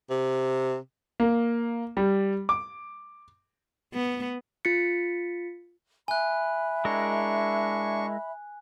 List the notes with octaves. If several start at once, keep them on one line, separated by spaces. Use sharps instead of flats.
C3
A#3
G3
D6
B3
F4 A6 B6 C#7
E5 G#5 B5 F#6
G#3 D4 E4 A#4 C#6